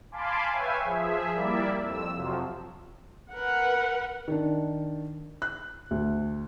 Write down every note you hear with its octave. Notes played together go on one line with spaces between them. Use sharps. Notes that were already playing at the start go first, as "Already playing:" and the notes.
F5 G#5 A5 B5 C6 D6
B4 C#5 E5 F5 G5 G#5
F3 G#4 E5
G3 A#3 E4 D5 E5
F2 E6
F2 C3 F3 F#3
A#4 B4 F#5
D#3 D4
F#6
D2